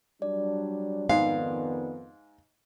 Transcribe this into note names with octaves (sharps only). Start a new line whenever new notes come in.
F#3 G3 D4 D5
F2 G#2 D#3 B3 F5